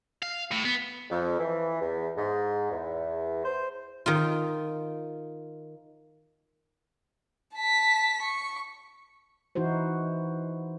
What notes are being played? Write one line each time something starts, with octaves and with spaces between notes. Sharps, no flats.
F5
A2
B3
F2
E3
E2
G#2
E2
C5
D#3 F4
A5 B6
C#6
E3 D#4 E4 F#4 C5